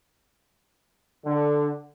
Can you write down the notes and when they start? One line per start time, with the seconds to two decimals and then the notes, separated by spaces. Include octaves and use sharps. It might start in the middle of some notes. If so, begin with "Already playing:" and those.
1.25 D3